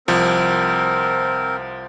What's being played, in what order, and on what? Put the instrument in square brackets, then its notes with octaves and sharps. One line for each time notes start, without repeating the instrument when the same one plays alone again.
[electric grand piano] C2 F3 [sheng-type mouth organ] C4 A#4